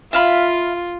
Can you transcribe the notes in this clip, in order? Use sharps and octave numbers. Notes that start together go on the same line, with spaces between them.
F4 E5 F5 B5